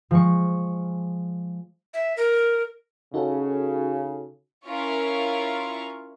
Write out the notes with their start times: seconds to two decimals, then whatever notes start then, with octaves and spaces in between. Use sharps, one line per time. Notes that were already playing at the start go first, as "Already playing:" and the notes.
0.11 F3 G#3 C#6
1.94 E5
2.17 A#4
3.14 C#3 D#4 F#4 A4
4.67 C#4 E4 F4 A#4 F5 C#6